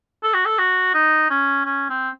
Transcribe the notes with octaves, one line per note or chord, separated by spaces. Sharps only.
A4
F#4
A4
F#4
D#4
C#4
C#4
C4